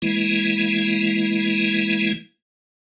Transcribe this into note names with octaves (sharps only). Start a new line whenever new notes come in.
E3 G#3 A#3 E4